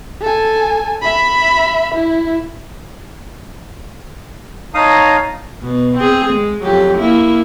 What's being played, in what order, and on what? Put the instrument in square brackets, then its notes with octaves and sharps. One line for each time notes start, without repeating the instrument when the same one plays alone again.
[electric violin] A4 G#5
E5 B5
E4
[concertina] D#4 F5 D#6 [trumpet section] C#5 A5 A#5
[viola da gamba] B2
C4 G#4
G#3
F2 F#3 G4
A#3 E4